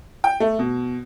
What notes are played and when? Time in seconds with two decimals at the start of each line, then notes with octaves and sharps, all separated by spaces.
0.24 G5
0.40 A3
0.59 B2